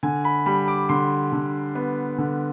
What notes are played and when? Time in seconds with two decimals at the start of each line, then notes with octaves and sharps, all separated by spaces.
0.03 D3 G#5
0.24 B5
0.46 G3 B5
0.68 D6
0.89 D3 C6
1.33 D3
1.75 B3
2.18 D3